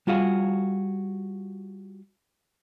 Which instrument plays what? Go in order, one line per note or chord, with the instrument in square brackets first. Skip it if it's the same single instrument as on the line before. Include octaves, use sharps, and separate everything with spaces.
[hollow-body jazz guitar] G3 F4 F#4 G#4 F5